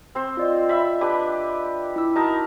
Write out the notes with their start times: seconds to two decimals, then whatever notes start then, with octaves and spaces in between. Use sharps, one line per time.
0.15 C4 C5
0.37 F4 D5 D#5
0.69 E5 B5
1.01 D4 G4 B4
1.96 E4 E6
2.16 D#4 F#4 A#4 A5 D#6